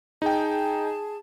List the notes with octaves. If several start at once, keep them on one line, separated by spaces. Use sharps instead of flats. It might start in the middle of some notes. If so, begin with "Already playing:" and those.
D#4 G#4 G5 A5